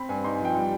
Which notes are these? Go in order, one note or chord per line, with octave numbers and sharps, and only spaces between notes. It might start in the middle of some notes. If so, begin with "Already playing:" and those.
Already playing: C4 B5
G2 G#5
D#4 C6
G#5
F3 G5
G3